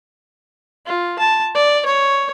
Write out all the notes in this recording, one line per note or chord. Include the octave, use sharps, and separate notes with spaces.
F4
A5
D5
C#5